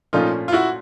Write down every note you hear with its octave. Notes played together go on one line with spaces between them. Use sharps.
A#2 F3 A3 C#4 D#4 F4
F4
E4 F#4